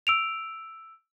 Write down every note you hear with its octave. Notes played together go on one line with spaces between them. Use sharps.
E6 D7 F7